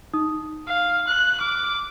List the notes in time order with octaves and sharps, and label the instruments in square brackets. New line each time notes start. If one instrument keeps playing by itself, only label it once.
[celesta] D#4 D#6
[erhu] F5
F#6
[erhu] D6 [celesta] F6